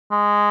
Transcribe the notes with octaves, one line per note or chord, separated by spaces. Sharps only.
G#3